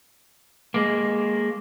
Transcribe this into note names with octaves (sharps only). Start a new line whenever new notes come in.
G#3 A#3